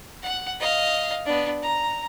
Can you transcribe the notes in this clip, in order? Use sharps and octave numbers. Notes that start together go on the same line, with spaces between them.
F#5
D#5 F5
B3 D4
A#5